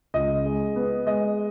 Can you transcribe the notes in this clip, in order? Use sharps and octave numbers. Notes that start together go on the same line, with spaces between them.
C#2 D#5
G#3
B3
G#3 D#5